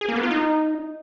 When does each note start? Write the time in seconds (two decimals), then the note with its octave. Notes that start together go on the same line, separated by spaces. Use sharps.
0.01 G#4
0.08 A#3
0.16 B3
0.23 F4
0.31 D#4